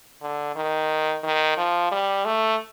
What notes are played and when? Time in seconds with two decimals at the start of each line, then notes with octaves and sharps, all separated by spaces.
0.22 D3
0.56 D#3
1.23 D#3
1.58 F3
1.92 G3
2.25 A3